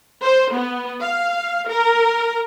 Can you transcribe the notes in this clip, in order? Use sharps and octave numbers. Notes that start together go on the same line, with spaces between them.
C5
B3
F5
A#4